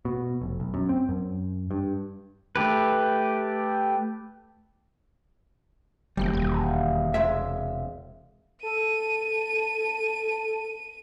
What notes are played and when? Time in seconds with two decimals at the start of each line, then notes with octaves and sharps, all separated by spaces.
0.05 B2
0.41 F1
0.60 B1
0.74 F#2
0.89 C4
1.09 F#2
1.71 G2
2.56 A3 G4 B4
6.17 F#1 D#2 G3
6.34 E1
7.14 C3 G#3 E5
8.63 A4 D#7